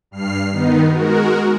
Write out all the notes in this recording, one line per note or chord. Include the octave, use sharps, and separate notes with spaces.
G2 F6 C7
D#3 B3 D#4
G#3 F#4 A#4